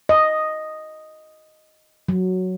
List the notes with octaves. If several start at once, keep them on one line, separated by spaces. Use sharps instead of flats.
D#5
F#3